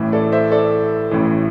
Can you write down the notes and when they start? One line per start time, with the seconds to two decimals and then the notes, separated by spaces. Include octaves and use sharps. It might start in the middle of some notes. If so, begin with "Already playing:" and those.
Already playing: A1 A2 E3
0.12 A4 D5
0.32 C5 E5
0.52 A4 D5
1.11 A1 A2 E3